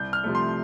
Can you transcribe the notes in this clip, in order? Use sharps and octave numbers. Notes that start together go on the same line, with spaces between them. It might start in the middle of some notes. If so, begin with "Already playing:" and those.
Already playing: C2 G6
F6
C3 F3 A3
C6